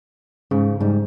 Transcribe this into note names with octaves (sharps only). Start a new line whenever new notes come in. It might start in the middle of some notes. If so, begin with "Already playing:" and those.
G#2 C#3
G#2 G3